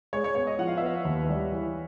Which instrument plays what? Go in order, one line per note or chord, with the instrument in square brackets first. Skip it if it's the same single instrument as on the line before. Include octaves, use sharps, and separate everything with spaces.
[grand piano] G#3 [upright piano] C#5
[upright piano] C#5
[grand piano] B3 [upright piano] C#5
[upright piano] D#5
[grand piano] F3 [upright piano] F#5
[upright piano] F5
E5
[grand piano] B3 [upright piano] F5
[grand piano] D#2
G3
E3